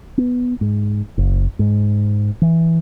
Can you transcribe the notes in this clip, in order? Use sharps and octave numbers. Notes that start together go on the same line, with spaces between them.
B3
G#2
F#1
G#2
E3